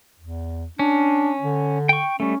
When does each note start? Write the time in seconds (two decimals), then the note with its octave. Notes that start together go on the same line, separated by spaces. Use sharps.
0.20 E2
0.79 C#4 D4
1.42 D3
1.89 G5 C#6
2.20 G3 A3 C#4